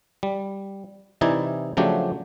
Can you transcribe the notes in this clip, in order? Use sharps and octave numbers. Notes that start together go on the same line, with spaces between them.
G3
C3 E3 D#4 E4 D5 G#5
C#3 F3 F#3 A3 D4 G4